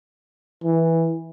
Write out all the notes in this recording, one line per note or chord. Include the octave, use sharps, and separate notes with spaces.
E3